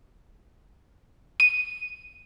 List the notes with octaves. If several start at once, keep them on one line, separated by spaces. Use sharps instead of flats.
D#7